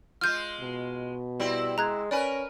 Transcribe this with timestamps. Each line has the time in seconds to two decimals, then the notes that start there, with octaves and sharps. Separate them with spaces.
0.21 G#3 F4 F6 G6
0.61 B2
1.40 G3 C4 E4
1.78 G#3 A#5 F#6 G#6
2.11 C#4 A#4 B4 D5 G#5